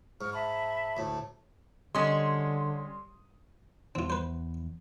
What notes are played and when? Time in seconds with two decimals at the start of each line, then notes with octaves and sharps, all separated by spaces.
0.21 G#2 C#6 F6
0.34 E5 A5 B5
0.97 D2 A2 A5
1.95 D3 G3 G#3 C#4 C6 D#6
3.95 E2 C4 F4
4.10 B4 C5